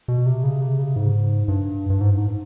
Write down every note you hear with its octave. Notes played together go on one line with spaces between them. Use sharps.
B2
C3
C#3
C3
C#3
G#2
G2
G2
G#2
G2
G#2